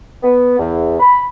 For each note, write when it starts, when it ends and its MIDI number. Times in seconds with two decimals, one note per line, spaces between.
0.23 0.55 59
0.58 0.96 40
1.00 1.25 83